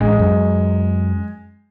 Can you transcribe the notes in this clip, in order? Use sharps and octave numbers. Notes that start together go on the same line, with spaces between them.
A1 G#3
F#2